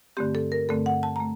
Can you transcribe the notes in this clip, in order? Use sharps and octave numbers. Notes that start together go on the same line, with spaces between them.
G2 D3 A3 C4 G4
A4
A#4
G2 D3 A3 C4 A4
F#5
A5
A3 A#5